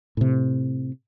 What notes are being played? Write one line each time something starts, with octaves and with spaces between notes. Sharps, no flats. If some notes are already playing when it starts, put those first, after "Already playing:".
A2 C3